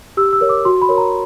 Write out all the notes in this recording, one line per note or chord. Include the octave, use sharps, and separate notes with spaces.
G4 E6
E6
A#4 C#5
D6
F#4 C6
B5
A#4 C#5
A#5